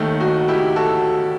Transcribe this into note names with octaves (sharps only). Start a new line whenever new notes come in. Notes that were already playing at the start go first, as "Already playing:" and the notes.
Already playing: D#2 D#3 A3
D#4 F#4
E4 G4
F#4 A4